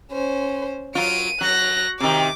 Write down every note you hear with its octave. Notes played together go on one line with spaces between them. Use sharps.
C#4 C5
F#3 F4 D7 D#7
F#3 F#6 A#6
C3 D#3 D6